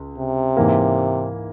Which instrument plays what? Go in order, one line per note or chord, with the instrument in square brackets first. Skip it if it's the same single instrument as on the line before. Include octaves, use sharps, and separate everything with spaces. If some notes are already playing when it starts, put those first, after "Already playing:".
Already playing: [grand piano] C#2
[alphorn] C3
[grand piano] G#2 E3 A#3